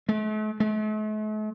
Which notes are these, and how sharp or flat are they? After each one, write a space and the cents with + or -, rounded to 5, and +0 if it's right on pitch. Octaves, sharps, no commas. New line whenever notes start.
A3 -45
A3 -45